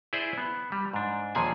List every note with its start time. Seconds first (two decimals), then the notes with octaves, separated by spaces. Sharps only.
0.13 E4 G#4 C5 D5 E5
0.38 B3
0.72 G3
0.93 G#2 D4
1.35 D#2 A#2 F3 G#4 G#5